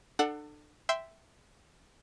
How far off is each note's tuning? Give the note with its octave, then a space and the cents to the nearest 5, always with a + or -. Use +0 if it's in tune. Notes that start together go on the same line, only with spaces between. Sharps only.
D4 +35 A4 +10 F#5 +0
E5 +0 G5 +0 C6 -15